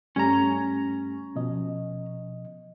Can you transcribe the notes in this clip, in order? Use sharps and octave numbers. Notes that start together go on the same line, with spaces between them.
G2 G3 A3 C#4 A#5
B2 F3 D#5